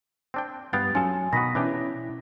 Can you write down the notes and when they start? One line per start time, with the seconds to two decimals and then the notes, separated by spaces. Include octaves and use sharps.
0.34 C4 D4 G5
0.73 G2 G3 B3 F5 G5 A6
0.95 F#3 C#4 F4 A4 G#5
1.33 B2 D#3 F#4 B5 D#6 A#6 B6
1.55 E3 C#4 D4 E4 G4